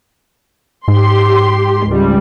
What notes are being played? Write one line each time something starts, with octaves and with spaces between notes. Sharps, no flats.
G#2 G4 C6
C#2 G3